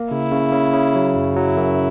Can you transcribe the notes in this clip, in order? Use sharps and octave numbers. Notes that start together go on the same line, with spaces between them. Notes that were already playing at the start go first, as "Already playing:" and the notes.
Already playing: A#3
C#3 E4
C#3
C#3
C#3
F#3
F#2
F#3 E4
F#2